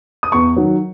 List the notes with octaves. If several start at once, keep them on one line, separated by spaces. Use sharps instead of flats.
D#6
E2 C#6
D#3 F#3